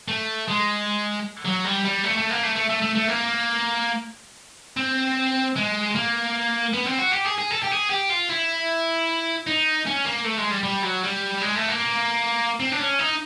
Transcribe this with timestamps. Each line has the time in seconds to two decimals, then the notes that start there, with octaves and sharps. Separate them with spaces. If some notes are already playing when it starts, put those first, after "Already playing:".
0.08 A3
0.48 G#3
1.45 F#3
1.65 G3
1.85 G3
2.04 A3
2.17 A3
2.30 A#3
2.43 A3
2.56 A3
2.69 A3
2.82 A3
2.95 A3
3.08 A#3
4.77 C4
5.56 G#3
5.95 A#3
6.74 B3
6.86 C4
6.99 F#4
7.12 G4
7.26 G#4
7.39 G#4
7.51 A4
7.63 G4
7.71 G#4
7.90 G4
8.10 F4
8.30 E4
9.47 D#4
9.86 C#4
10.05 A#3
10.25 A3
10.38 G#3
10.51 G3
10.64 G3
10.83 F#3
11.04 G3
11.41 G#3
11.55 A3
11.69 A#3
12.60 C4
12.71 D4
12.79 C#4
12.99 D#4